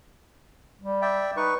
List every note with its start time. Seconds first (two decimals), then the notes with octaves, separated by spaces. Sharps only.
0.82 G3
1.02 D5 E5 G5
1.37 D#4 B4 C#6